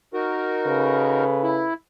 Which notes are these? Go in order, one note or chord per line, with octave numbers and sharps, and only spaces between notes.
D#4 F#4 A#4
C#3 A4 B4
E4